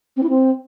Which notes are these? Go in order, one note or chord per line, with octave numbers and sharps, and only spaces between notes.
C4
E4
C4